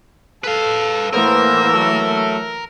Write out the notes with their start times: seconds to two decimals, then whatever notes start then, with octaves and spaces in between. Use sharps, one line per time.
0.44 A4 B4 F5
1.13 A2 E3 A#3 B3 A#4 C5 E6
1.72 F#3 A3